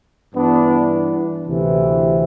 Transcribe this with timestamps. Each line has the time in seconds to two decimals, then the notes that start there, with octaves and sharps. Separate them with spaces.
0.34 G2 E3 B3 D4
1.46 D2 C3 E3